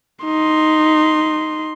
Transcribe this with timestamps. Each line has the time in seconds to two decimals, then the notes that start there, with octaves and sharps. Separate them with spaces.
0.25 D#4 C6